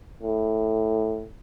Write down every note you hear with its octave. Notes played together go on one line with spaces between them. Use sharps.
A2